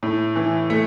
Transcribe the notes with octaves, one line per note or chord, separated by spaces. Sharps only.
A2
E3
A3